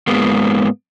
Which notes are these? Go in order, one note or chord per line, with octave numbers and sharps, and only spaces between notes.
G#2 G#3 A#3 B3